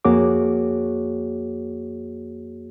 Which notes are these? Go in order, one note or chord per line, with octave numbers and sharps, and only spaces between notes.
F2 A#3 F#4 G#4 C#5 D6